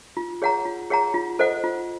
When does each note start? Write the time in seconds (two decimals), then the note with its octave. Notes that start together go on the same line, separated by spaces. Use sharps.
0.17 F4
0.42 G#4 C#5 F#5 A#5
0.65 F4
0.90 G#4 C#5 F#5 A#5
1.14 F4
1.39 A4 C5 D#5 F#5
1.64 F4